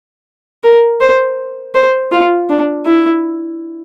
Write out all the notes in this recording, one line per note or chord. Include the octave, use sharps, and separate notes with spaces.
A#4
C5
C5
F4
D4
E4